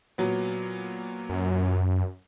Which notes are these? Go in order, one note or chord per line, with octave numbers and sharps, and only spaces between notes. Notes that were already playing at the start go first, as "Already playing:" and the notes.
A#2 F#3 B3
F#2